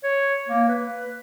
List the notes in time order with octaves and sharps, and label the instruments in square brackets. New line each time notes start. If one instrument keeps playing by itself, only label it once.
[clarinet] C#5
A#3
B4